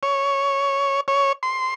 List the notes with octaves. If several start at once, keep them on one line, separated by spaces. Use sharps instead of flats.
C#5
C#5
C6